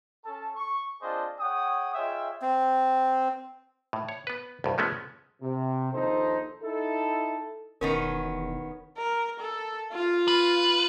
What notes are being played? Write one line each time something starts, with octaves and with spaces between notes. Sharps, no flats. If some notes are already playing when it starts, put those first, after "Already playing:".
C#4 A4 A5
C#6
C4 D4 F4 G#4 C5 D#5
G#4 C#5 F#5 G5 D#6
F4 G#4 C#5 D#5 E5 G5
C4
A2
C#5
B3 B4
C2 G2
F3 G#3 A3 B3 C#4
C3
A#1 D#2 D#4 A4 C5
D#4 E4 A4
E1 D#3 B3 C#4 A#4 C#6
A#4
A4
F4
B4